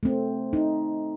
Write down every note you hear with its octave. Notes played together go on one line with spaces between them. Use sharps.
A3 C4
D#4